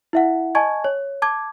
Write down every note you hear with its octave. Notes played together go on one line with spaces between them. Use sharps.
E4 E5 F#5
D#5 G#5 A5 C#6 G#6
C#5
A5 D6 G#6